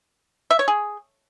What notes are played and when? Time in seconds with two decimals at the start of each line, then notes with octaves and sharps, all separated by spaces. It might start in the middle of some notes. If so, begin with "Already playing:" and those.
0.51 E5
0.59 C#5
0.68 G#4